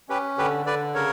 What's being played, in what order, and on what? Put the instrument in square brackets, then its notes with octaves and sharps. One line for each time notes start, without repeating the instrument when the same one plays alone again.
[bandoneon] C#4 G4 B4
D3 G4 B4
D3 B4 D5
C#3 A#4 C#5